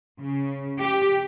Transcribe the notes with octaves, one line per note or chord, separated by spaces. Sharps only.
C#3
G4